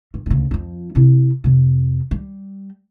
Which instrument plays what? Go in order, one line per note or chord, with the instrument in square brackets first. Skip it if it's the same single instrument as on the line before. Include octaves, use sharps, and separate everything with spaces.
[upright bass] G2
D2 C#3
F2 F3
C3 E4
F2 C3
G3